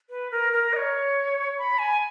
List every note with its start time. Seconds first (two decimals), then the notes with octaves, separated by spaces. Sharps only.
0.10 B4
0.31 A#4
0.53 A#4
0.73 D#5
0.76 C#5
1.58 B5
1.78 G#5